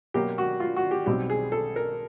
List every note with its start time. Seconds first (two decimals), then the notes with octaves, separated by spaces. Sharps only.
0.14 B2 F#3 A#3 G4
0.38 F#4
0.60 F4
0.76 F#4
0.91 G4
1.06 B1 B2 G3 C4 G4
1.30 G#4
1.52 A4
1.76 A#4